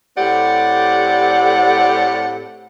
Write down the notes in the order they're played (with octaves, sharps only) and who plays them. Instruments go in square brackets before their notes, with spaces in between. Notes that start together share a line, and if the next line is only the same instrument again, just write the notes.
[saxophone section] A2 C4 G4 D5 F#5